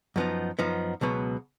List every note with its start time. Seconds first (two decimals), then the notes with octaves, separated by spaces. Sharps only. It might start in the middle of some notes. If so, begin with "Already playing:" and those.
0.16 F#2 F3 B3 D#4
0.59 F#2 F3 B3 D#4
1.01 C#2 B2 F#3 B3